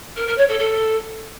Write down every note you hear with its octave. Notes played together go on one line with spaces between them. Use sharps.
A#4
A#4
C#5
A4
A4